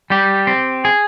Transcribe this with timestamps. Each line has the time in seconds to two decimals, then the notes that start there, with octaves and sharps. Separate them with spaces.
0.10 G3 G4
0.47 C4
0.85 G#4